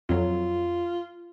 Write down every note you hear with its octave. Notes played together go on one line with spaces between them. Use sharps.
F2 F#3 F4